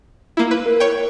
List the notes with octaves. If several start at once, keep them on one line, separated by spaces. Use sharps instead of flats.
A#3 E4
B4
A#4
C#5 G5